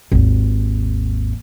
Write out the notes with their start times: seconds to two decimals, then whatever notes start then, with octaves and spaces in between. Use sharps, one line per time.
0.12 G#1 D#2